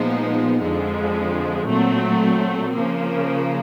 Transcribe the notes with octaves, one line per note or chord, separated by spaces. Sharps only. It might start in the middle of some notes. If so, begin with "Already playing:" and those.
Already playing: A#2 F3 G#3 B3 D#4
F2 D3 F3 G#3
A#2 F#3 A3 C4
C#3 F3 A#3